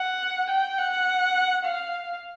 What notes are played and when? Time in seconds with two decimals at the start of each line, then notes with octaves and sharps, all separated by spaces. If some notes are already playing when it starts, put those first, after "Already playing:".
Already playing: F#5
0.50 G5
0.78 F#5
1.64 F5